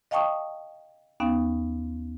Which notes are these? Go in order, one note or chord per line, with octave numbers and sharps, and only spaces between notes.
D#5 F5 G5 A5 C#6 D#6
D#2 B3 C#4 D#4 F5